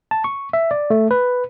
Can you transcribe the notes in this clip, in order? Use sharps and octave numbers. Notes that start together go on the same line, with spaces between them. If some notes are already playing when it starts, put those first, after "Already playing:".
A5
C#6
E5
D5
A3
B4